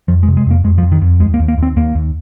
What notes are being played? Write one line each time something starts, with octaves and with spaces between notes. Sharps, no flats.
F2 F3
G#3
C3
G#3
F2 A#3
F2 G#3
F3
F2
D#3
F2
D#2 G#3
A#3
D#2
A#3
D#2 C4
D#2 A#3
D#2